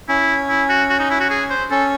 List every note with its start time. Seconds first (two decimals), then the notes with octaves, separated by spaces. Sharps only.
0.09 C#4 E4
0.49 E4
0.70 F#4
0.90 F#4
1.00 D#4
1.10 E4
1.20 F#4
1.30 G#4
1.50 C5
1.70 C#4 A4